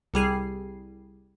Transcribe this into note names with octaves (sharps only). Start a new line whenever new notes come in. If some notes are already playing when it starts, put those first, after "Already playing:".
C2 G3 G#4 C7